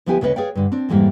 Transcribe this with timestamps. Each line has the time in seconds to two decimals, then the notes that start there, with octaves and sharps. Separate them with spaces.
0.06 D2 F3 B3 E4 G4 G#5
0.21 D2 C#3 B3 B4 C#5 D#5
0.36 G#4 B4 C#5 D5 F5 G5
0.55 G2 D3
0.72 C4 D4
0.89 F2 G#2 E3 G3 A#3